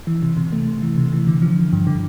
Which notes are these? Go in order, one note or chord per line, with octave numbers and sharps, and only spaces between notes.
E3
C3
C3
A3
C3
E3
C3
E3
D3
F3
D3
G2
D3